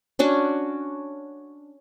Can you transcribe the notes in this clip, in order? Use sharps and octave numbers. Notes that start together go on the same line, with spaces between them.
C#4 D4 F#4